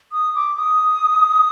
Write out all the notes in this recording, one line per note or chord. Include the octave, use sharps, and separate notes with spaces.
D#6
D6
D#6